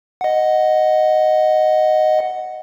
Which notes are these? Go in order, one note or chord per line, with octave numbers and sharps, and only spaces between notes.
D#5 F#5